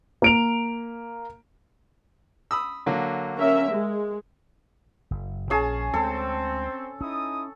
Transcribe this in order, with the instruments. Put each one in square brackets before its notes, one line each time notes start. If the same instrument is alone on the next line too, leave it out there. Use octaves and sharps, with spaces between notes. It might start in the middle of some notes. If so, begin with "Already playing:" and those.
[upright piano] A#3 D7 F7
[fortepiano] B5 D#6 E6
D3 F#3 A#3
[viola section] C#4 A#4 E5
G#3
[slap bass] F#1
[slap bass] A#1 [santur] C#4 G#4 A5
[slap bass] D2 G#3 [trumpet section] C4 [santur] A4
[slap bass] C#4 [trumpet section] D#4 E4 D#6